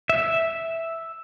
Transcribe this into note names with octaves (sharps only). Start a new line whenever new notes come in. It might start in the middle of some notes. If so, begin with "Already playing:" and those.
E5